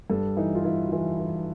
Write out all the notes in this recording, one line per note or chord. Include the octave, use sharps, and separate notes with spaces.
G2 A4
E3 D#4
F4
E3 E4
F#4
E3 F4
E3